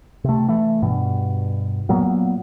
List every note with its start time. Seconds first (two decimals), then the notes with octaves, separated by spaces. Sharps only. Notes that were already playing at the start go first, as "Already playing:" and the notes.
0.24 C3 A3
0.48 E3 A3
0.82 G2 B2
1.89 A#2 F#3 A#3 B3